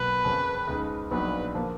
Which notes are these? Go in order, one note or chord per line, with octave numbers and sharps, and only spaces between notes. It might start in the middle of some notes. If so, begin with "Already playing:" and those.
Already playing: B1 B2 F#3 A#3 B4
F2 C#3 F3 A#3 C#4
C#2 C#3 G#3 D#4
A#1 A#2 F#3 B3 D#4 B4
F3 A#3